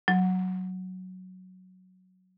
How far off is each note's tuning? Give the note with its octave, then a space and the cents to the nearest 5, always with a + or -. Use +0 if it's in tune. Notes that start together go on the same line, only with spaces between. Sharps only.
F#3 +0